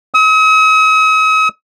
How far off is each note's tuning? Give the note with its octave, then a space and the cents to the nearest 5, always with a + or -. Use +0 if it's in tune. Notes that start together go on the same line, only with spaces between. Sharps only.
D#6 +45